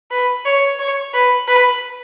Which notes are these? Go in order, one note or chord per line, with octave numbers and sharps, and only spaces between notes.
B4
C#5
C#5
B4
B4